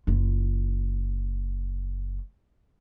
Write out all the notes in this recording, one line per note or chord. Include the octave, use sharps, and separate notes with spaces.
F#1 F4